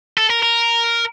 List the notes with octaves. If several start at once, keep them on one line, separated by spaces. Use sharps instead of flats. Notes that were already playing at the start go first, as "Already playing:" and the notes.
A4
A#4
A#4